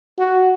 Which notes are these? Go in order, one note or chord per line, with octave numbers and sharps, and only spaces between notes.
F#4